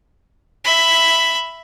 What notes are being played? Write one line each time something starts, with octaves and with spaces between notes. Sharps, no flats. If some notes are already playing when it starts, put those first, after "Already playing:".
E5 B5